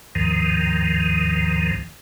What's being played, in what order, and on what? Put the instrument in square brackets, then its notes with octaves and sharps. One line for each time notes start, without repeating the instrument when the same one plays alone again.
[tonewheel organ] D#2 G#2 D#3 F3